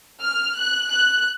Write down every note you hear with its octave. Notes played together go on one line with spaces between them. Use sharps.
F6
F#6
F#6